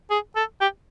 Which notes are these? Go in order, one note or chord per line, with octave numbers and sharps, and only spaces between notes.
G#4
A4
G4